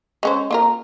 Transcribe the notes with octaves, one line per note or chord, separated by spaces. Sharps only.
G#3 C#4 C5
A#3 F4 A#4